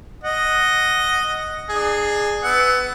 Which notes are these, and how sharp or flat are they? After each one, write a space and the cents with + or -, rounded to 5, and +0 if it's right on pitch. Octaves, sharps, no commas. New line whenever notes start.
D#5 +0 F#5 +0
D4 +35 G#4 +0
B3 +20 F#5 +20 E6 -15